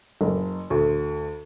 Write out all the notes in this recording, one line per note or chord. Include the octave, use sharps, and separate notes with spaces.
F#1
D2